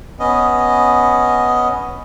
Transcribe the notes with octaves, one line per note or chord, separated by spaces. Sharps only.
B3 C#4 D#5